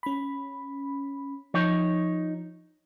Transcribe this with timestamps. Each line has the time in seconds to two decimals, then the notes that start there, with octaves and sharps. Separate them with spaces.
0.03 C#4 B5
1.54 F3 D#4 C#5